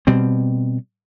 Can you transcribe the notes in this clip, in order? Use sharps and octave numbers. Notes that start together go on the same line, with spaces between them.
B2 G3 C4